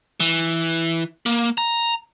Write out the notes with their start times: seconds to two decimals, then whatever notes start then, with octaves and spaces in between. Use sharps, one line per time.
0.20 E3
1.26 A#3
1.58 A#5